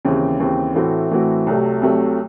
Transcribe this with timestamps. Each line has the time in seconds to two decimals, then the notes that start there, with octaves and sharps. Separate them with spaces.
0.05 D#2 C#3 E3 C4
0.40 D#2 C#3 E3 C4
0.75 A2 E3 A3 C4 F#4
1.11 A2 E3 A3 C4 F#4
1.47 C2 C3 F#3 A3
1.82 C2 C3 F#3 A3